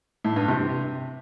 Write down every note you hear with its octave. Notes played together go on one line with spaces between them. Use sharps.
A2
G2
C3